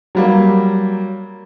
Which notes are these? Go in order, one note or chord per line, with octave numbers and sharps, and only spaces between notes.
F#3 G3 A#3